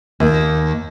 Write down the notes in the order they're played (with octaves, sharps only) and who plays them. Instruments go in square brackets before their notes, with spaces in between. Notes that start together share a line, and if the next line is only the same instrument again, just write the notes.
[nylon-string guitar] D#2